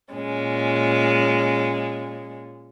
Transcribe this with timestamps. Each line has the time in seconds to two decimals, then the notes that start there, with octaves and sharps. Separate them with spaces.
0.14 A#2 G#3 C#4